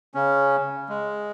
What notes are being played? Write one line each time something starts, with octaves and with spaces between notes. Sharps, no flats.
C#3 C#4
G#3